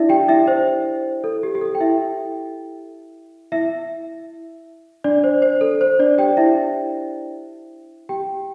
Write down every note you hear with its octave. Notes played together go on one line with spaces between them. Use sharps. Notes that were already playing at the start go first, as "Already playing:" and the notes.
Already playing: D4 E4 D5 E5
G4 G5
E4 E5
C5
A4
G4
G4
A4
G5
E4 E5
E4 E5
D4 D5
C5
C5
A4
C5
D4 D5
G4 G5
E4 E5
G4 G5